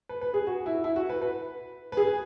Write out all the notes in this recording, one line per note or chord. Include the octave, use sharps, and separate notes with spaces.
B4
B4
G#4
F#4
E4
E4
F#4
B4
B4
B4
G#4